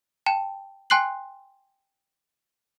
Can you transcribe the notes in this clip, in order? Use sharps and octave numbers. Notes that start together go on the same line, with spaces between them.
G5 A5 E7
G5 G#5 C6 F#6 C7 F#7